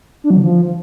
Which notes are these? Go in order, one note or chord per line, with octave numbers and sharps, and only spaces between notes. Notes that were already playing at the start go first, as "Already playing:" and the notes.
D4
F#3
D3
F3